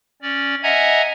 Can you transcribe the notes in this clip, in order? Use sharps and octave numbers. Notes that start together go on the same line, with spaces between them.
C#4 D5
D#5 E5 F#5 G#5 A#5 G#6